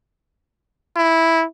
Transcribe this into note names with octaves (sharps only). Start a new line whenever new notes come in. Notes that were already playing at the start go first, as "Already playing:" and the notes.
E4